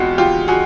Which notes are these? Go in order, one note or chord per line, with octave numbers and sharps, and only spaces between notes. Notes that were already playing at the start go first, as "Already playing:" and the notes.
Already playing: E2 G#3 C4 F4 F#4
F4 G4
F#4 G#4